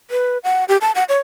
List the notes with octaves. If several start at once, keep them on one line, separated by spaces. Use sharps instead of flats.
B4
F#5
G4
A5
F#5
C#5